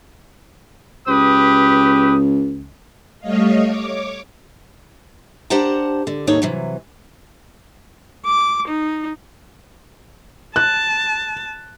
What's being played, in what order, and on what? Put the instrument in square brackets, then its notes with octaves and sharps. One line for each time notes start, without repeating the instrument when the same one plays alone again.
[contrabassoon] C#2 [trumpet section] G4 B4 D#6
[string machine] G3 A3 C#5 D#5 F5
C#5 D6
[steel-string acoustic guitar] D4 G4 C5 F#5 A5 A#5
D3
D#2 A2 C3 A3 D#4 C#5
C3 E3 F#3
[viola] D6
D#4
[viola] A5 [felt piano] F#6